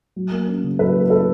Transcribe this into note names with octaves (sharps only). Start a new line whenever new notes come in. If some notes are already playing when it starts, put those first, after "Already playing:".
F#3
A#3
C#4
C#3
F#3 A4 B4
A#3
C#4 A4 B4